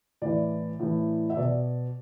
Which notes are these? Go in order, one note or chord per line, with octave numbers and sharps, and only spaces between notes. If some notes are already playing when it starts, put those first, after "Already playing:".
A2 E3 D5
A2 E3
E5
B2 D5